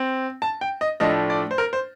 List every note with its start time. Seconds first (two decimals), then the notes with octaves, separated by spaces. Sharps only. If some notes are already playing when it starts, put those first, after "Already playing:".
Already playing: C4
0.42 A5
0.61 G5
0.81 D#5
1.00 A2 F3 A3 D4 D#5
1.30 D5
1.51 C5
1.58 A#4
1.73 C5